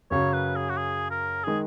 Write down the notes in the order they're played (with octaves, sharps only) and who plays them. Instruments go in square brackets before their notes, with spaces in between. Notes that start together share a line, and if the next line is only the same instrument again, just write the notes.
[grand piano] F#2 C#3 F#3 C#4 [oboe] C#5
[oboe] B4
G#4
F#4
G#4
A#4
[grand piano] D#3 G#3 [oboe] G#4